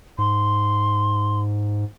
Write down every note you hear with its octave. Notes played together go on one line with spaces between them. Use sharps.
G#2 C6